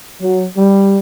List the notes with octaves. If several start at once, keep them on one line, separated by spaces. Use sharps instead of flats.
F#3
G3